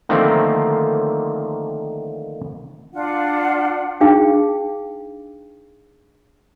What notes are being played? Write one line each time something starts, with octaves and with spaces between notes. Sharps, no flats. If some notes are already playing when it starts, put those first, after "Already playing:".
D3 D#3 F3 A3 A#3 C4
D4 F4 F#5
D4 D#4 G#4 F5 G5